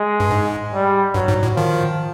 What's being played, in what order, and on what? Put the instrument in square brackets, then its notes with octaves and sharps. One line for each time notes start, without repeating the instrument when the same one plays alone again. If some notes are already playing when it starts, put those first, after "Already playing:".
Already playing: [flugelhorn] G#3
[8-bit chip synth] G2
G#2
[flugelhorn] G3
[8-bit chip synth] G2 [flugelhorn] F#3
[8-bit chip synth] G#2
A2
[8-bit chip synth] D#3 [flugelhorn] F3